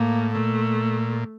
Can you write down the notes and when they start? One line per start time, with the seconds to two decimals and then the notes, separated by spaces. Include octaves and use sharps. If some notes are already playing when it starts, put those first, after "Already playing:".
Already playing: A2 A#3
0.35 A#2 A3